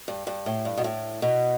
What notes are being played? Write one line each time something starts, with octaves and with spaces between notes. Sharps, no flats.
G2
G2
A2
G2
B2
A2
B2